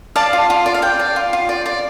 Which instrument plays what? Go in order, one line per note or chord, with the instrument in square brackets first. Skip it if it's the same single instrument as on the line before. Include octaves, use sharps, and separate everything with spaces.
[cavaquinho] D5 F5 A5
F4
F4
D5
F5
D5 G5
D5
F4
F4
D5
D5